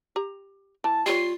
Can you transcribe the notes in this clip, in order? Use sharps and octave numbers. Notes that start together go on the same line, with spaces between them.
G4 A#5
E3 A5
G3 F4 C#5 C7